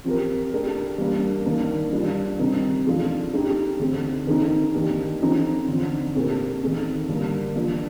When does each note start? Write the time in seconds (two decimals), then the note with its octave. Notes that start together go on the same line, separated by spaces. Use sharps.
0.04 F3 C4 G4 A#4
0.52 A3 D4 G4 A#4
0.98 G3 A#3 D4
1.46 D#3 A#3 D4
1.92 G3 D4 F4
2.39 C3 D#3 G3 C4 D#4
2.85 C3 F3 A3 D4 F4
3.33 A3 D#4 G4
3.79 D3 A3 C4
4.27 D#3 A3 C4 D#4
4.74 D#3 A#3 D4 G4
5.21 F3 C4 D#4 A4
5.68 D3 F3 C4
6.15 A#2 A3 C4 G4 A#4
6.62 D#3 A3 C4
7.08 D3 G3 A#3 D4
7.56 F3 A#3 D4